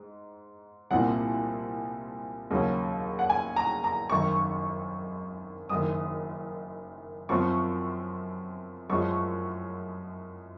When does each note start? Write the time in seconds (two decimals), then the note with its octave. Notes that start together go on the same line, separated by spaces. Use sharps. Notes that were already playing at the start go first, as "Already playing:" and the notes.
Already playing: G#2
0.91 C2 A#2 F3 C4 F#5
2.51 D#2 C#3 F#3 C#4
3.19 F#5
3.30 G#5
3.56 A#5
3.84 A#5
4.09 G#1 F#2 D#3 C#6
5.69 F#1 F#2 D#3 D#6
7.29 F#2 F3 C4 C#6
8.90 F#2 F3 G#3 C#4 C#6